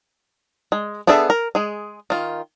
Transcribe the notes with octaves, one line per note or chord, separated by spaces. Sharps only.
G#3
B3 D4 G#4 A4 E5
A#4
G#3 G#4
D#3 F4